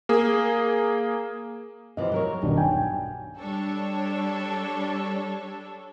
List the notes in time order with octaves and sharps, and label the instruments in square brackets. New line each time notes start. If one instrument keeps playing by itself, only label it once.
[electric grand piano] A#3 G#4
[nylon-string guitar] C3 E3 F3 [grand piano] D#5
[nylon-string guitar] F#3 A#4 C#5
[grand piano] D#1 B1 D4 [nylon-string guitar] G2
[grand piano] G5 G#5
[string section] G3 D4 A4 C#5